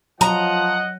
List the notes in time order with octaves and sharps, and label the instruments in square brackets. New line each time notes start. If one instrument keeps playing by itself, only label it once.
[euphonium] F3 [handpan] F#3 [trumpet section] D#5 F#5 [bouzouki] A#5